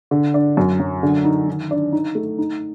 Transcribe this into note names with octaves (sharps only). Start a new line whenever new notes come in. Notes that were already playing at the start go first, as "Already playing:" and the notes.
D3
D4
F#2
F#3
D3
D#4
D#3
D4
D#4
A3
D#4